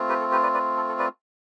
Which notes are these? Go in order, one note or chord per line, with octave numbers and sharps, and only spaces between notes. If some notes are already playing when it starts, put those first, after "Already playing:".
Already playing: A3 C4 F4
G4 B4
A4
G4 B4
B4 D5
B4 D5
A4
A4
B4 D5